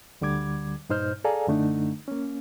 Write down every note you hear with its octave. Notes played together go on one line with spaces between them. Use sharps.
D2 D3 G3 D6 G#6
G2 A#2 D#4 C5 F6 G6
G#4 A4 D5 F5 G#5 A#5
F#2 D3 A3 D4 D#4
A#3 C#4